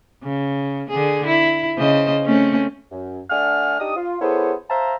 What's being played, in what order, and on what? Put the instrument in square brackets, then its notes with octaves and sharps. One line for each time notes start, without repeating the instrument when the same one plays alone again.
[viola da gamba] C#3
D3 G#4
E4
C#3 C5 D#5
A3 C4 C#4
[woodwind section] F#2
A3 D4 F#5 G#5 F6
D4 D#4 G4 D#6
F4
B3 E4 G#4 A4 C5 C#5
C5 E5 F5 A5 A#5